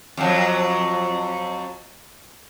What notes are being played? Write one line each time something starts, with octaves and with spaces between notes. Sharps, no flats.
F2 F#3